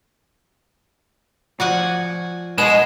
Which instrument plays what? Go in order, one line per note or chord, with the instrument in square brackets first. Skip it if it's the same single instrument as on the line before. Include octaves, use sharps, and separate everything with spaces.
[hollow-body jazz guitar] F3 F#4 [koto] D5 F#5 G#5
[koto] B2 [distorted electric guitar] G#3 [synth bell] E7